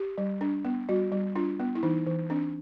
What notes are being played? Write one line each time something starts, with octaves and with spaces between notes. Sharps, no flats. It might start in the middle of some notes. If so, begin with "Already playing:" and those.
Already playing: G4
G3
D4
B3
G3 F#4
G3
D4 F4
B3
E4
E3 D#4
E3
C4 D4